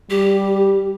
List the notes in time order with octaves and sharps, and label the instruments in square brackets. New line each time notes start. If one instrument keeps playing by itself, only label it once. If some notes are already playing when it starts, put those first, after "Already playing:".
[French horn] G3 [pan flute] G4